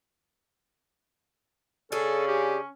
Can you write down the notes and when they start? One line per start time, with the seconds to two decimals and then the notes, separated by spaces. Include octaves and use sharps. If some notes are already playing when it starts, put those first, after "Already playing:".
1.92 C#3 C#4 D4 G#4 A4
2.28 G4